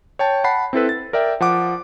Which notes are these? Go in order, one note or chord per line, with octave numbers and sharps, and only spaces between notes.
C#5 G5 A5
F#5 A5 B5 C7
C4 E4 A4 B4
A6
A#4 D5 E5 G5
F3 F#5 D6